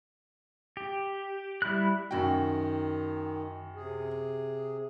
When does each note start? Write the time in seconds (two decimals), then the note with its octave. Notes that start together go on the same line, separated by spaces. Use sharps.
0.77 G4
1.62 G3 E4 B5 F6 F#6
2.11 F#2 D#3 F#4 G5
3.75 C3 G#4